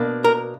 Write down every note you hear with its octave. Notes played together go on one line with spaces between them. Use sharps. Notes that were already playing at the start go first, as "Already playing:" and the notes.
Already playing: B2 A#3 D4
A#4